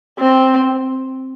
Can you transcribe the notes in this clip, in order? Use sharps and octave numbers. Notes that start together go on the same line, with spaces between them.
C4